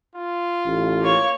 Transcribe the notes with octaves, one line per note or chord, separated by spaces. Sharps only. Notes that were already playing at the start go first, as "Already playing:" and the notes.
F4
A1
A#3 C#5